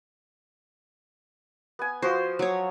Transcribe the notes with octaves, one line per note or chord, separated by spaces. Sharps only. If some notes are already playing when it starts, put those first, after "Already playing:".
B3 G#5
F3 F#4 C5
F#3 C#5